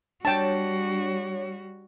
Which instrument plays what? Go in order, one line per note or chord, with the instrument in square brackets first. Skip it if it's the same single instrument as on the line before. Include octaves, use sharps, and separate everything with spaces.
[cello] G3 F#4 [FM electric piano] D4 C#5 [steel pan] G5 A5